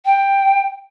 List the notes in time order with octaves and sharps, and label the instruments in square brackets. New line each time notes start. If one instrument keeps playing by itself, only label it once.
[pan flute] G5